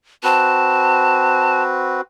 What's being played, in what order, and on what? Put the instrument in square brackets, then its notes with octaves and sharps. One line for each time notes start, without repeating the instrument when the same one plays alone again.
[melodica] C4 F#4 B4 [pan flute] A5